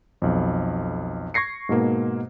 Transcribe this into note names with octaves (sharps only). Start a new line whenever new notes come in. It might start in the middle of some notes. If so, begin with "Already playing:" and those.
B1 F2
C#6 G#6 A#6 C7 C#7
G#2 B2 A#3